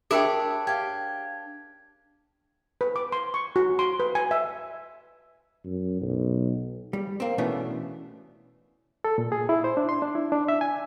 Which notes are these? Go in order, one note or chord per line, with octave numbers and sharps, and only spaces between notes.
D4 G#4 A#4 C#5 E5 G5 B5 D6
G4 F5 G#6
B4
D6
C6
C#6
F#4
C6
B4
G#5
E5
F#2
B1
G3
A#3 C4
B2 E3 A3 B3 C#4 D4
A4
A#2
G#4
E4
C5
D4
C6
D4
E4
D4
E5
G#5